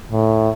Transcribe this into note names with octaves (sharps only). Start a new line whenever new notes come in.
A2